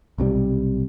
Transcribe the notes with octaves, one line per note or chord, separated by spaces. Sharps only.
B1 C3 D#3 G3